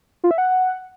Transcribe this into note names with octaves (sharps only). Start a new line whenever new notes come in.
F4
E5
F#5